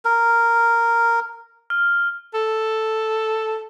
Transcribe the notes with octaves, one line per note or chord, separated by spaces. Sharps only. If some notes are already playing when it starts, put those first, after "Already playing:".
A#4
F6
A4